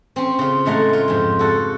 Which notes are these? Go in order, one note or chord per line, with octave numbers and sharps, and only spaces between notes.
C4 C#4
C#3 F4
A2 G#3 A3 F#5 A#5
F4
F2 G#2
F#4 A4 F#5